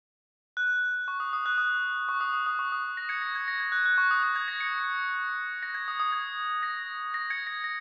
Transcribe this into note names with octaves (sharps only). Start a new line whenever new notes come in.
F#6
C#6
D#6
D#6
F#6
D#6
C#6
D#6
D#6
D#6
C#6
D#6
A#6
G#6 C#7
A#6
G#6
A#6
G#6
F#6
F#6
C#6
D#6
D#6
G#6
A#6
G#6 C#7
A#6
G#6
D#6
D#6
G#6
A#6
A#6
G#6 C#7
A#6
A#6